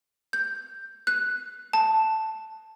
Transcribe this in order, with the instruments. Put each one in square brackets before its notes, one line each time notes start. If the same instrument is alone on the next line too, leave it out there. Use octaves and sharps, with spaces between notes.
[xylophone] G6
F#6
A5